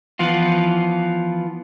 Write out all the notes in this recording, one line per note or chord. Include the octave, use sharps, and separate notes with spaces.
E3 F3 B3 F4